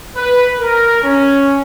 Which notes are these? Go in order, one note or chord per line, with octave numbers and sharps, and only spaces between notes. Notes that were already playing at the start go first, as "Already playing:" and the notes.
B4
A#4
C#4